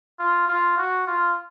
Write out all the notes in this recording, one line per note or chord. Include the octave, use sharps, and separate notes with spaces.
F4
F4
F#4
F4